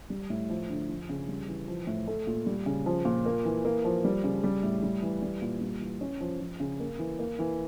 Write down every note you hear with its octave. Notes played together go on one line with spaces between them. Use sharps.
G3
A2
F3
D3
F3
C#3
G3
E3
F3
A2
A3
A#2
G3
C#3
F3
A#2
A#3
E3
A#3
F3
G3
C#3
G3
A2
G3
E3
G3
A#2
G3
E3
C#4
F3
F3
C#3
A#3
E3
A#3
E3